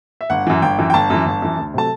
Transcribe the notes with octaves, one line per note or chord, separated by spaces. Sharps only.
E5
G1 F#5
F#2 E3
G1 G5
F#2 E3
G5
G1 A5
F#2 E3
G1
F#2 E3
D2
C3 F#3 A3 A5